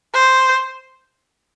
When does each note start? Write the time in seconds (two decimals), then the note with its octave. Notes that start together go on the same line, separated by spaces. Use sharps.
0.14 C5